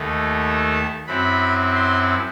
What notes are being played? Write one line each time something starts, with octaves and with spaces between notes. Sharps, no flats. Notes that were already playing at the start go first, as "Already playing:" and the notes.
Already playing: D#2 D#3 A3
A5
F#2 F#3 C4 E4 B5
C6